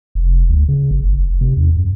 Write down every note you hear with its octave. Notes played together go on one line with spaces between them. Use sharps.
F1
D2
C#3
G1
G1
F#1
C3
E2
F#2